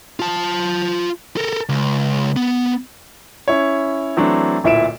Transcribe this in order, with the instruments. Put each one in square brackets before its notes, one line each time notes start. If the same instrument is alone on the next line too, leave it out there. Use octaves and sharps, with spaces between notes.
[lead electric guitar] F4 A5
A4 A#4
C#2
B3
[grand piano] C#4 E4 C#5
E3 F#3 A3 C4 D4
D1 A#2 E4 E5 D7 E7